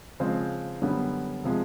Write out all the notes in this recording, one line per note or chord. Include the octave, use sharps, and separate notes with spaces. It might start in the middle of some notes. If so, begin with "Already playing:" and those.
C#3 F3 G#3 C4
F#2 D3 G3 B3
C3 F3 G#3